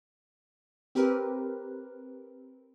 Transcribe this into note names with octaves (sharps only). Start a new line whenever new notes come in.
C4 G4 A#4 B4